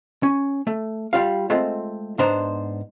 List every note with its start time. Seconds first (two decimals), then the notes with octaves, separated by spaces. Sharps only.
0.23 C#4
0.67 A3
1.13 G3 F4 F5
1.50 G#3 A3 C4 F4
2.19 G#2 B3 D4 C5 A#5